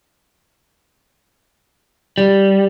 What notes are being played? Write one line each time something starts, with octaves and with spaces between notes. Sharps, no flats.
G3